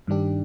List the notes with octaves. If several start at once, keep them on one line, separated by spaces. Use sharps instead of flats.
G2 D#3 G3 D4 G4